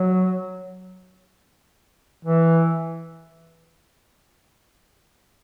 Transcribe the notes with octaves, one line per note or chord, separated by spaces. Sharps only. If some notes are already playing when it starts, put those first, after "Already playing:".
Already playing: F#3
E3